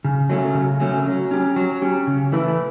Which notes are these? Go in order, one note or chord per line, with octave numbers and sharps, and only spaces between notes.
C#3
F#3 A3 C#4
C#3
F#3 A3 C#4
F#3
C#4 G4
F#3
C#4 G4
C#3
E3 A3 E4 B4